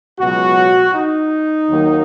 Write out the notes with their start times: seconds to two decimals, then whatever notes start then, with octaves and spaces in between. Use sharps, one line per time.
0.19 C#2 B2 F#3 F#4
0.93 D#4
1.68 D#2 D#3 F#3 A#3